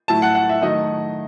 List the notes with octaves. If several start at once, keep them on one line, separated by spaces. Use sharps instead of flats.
A2 F#3 A3 E4 A5
F#5
F#5
E5
D#3 F#3 A3 D#4 D#5